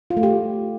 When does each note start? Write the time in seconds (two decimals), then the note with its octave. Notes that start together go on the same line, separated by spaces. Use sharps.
0.10 F4
0.17 A3
0.23 G4